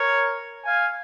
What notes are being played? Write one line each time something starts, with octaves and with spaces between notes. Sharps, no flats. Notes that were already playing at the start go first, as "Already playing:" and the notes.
Already playing: A#4 C#5
F5 G#5